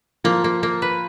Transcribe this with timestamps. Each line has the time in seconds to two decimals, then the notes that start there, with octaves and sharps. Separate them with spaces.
0.24 F3 A#3
0.44 A#3
0.63 A#3
0.82 B4